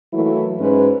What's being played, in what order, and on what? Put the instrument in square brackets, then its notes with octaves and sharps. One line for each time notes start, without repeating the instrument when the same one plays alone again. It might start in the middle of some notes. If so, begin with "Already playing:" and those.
[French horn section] E3 F#3 A3 A#3 E4
G#2 C#4 B4